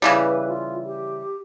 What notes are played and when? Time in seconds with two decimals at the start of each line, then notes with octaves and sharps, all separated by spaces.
0.02 C#3 E3 G3 B4
0.48 F4
0.85 G4